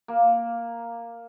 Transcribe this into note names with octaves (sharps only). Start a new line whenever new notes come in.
A#3